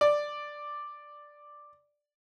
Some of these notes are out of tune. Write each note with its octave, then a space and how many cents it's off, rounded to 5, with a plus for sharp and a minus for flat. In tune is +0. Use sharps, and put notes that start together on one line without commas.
D5 +5